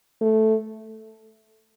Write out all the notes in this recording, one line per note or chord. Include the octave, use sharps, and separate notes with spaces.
A3